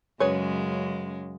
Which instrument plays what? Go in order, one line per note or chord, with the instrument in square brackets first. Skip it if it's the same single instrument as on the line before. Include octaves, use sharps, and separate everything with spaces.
[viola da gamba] F#2 C#3 G#3 [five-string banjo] G#4 B4 C#5